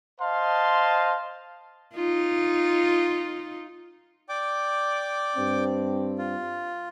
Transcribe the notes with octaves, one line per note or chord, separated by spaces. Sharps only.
C5 D#5 F5 A5 C6
D#4 F4
D5 G5 D6
G2 C4
F4